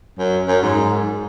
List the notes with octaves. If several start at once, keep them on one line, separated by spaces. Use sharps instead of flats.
F#2
F#2
G#2